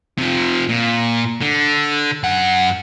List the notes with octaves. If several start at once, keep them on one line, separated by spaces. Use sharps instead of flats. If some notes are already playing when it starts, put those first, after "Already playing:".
C3 F3
A#2
D3
F#2 F#5